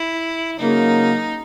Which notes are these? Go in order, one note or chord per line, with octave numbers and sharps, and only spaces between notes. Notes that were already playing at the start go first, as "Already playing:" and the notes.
Already playing: E4
C#3 F#3 A#3 D#4